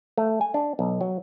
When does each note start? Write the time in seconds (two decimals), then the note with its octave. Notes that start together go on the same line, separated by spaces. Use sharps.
0.17 A3
0.41 G#5
0.54 D4
0.79 B1
1.01 F#3